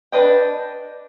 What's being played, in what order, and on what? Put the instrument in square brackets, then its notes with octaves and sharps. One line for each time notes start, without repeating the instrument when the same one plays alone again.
[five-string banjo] D4 B4 D#5 G5